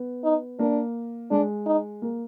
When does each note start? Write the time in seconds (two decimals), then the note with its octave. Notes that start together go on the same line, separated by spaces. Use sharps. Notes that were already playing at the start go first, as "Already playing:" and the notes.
Already playing: B3
0.24 D#4
0.59 A#3 D4
1.31 G#3 D4
1.66 D#4
2.02 A#3